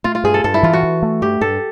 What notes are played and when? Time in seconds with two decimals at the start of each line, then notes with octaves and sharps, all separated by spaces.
0.04 A3 F4
0.15 F4
0.24 G2 G#4
0.34 A4
0.44 G2 A4
0.54 E4
0.63 E3 F4
0.73 F#4
0.83 E3
1.03 A3
1.22 G2 G4
1.41 G2 A4